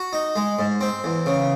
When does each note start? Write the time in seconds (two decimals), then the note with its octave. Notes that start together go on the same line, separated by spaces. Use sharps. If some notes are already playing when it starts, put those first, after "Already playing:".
Already playing: F#4
0.13 D#4
0.36 G#3
0.59 G#2
0.81 C4
1.04 E2
1.26 C#3